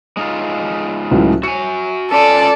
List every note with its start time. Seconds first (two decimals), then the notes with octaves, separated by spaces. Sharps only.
0.17 G#3 D#4 F4
1.11 C#2 A2 F#3
1.43 F#4 G#5 C#7
2.12 C#4 F4 A4 D5 G#5